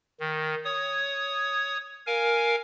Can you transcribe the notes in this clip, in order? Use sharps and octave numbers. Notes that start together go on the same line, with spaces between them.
D#3
C#5 D#6
A#4 F5 G#5